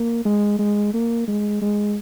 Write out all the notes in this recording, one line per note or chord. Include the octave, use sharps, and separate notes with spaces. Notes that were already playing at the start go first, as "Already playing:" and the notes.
Already playing: A#3
G#3
G#3
A#3
G#3
G#3